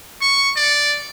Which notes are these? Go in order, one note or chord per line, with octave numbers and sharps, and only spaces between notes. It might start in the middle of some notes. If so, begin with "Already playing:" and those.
C#6
D5